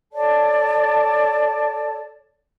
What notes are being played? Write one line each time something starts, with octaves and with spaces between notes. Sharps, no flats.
A4 C#5 D5 A5